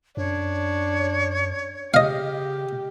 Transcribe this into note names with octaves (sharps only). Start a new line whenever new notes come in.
F#2 D4 C#5
C#3 G4 D#5 F5